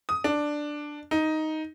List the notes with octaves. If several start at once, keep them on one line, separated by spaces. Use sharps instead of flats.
D#6
D4
D#4